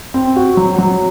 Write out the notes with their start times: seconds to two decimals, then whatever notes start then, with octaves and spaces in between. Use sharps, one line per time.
0.14 C4
0.36 F#4
0.57 F#3
0.79 F#3